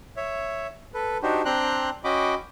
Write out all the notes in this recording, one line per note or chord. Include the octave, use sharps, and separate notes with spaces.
C#5 E5
A4 B4
D4 D#4 F#4 G4 C5
C4 D4 G5 A#5 C6 F#6
C#4 F#4 D#5 G5 B5 D6